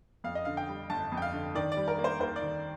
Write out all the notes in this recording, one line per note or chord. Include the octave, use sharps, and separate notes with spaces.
F2 F5
D#5
D3 F5
G5
G3
G1 A5
F2
G5
F5
D3
D#3 D5
D5
G3
A#4
A#3
C5
D#2 C5
D5
D#3